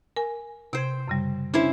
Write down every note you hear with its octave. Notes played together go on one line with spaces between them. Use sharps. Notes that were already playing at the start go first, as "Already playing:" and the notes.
A#4 G#5
C3 C5 G5 G#6
F#2 C#3 G3
C#4 D4 E4 C5